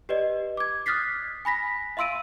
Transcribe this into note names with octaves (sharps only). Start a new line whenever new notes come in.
G4 B4 D5 D#5
D6 G#6
D#6 F6 F#6 A6 B6 C7
G#5 B5 A#6 B6
E5 F5 C6 E6 D7 D#7